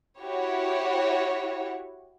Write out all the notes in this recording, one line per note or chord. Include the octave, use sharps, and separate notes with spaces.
E4 F#4 G4 C#5